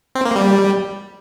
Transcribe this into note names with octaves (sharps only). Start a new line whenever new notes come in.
C4
A#3
G3